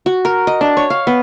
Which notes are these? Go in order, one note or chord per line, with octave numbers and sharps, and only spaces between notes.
F#4
A#4
D#5
D4
C#5
F5
B3